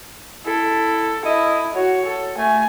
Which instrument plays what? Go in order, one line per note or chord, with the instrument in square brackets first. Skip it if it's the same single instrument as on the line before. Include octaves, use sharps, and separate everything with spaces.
[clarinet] E4 [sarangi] A4
[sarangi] E4 [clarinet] D#5
[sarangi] F#4 [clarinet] C#5
[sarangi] A4
[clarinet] A3 [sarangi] G#5